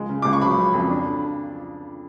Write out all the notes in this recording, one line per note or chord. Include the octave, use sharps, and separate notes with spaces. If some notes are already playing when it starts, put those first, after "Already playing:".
Already playing: C#2 G#3
C#3
C#2 D6
C#6
F#3 B5
C#3
F2
D4